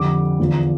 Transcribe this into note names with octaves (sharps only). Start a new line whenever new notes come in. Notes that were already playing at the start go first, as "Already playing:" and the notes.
Already playing: F2 D3 G3 D6
E2 D3 F3